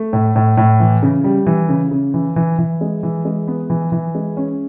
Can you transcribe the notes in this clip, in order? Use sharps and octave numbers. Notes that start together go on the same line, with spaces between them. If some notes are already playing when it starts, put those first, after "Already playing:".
Already playing: A3
A2
A2
A2
E3
C#3
G3
E3
C#3
C#3
E3
E3
E3
G#3
E3
G#3
B3
E3
E3
G#3
C#4